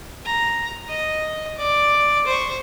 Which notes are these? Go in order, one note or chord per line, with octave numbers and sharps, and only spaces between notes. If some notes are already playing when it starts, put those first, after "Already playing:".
A#5
D#5
D5
C5 C#6